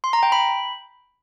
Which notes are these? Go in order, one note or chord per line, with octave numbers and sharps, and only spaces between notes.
C6
A#5
G5
B5